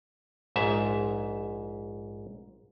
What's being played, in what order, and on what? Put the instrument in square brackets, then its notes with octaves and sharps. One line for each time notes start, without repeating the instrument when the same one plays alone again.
[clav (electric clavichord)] A#1 G#2 E5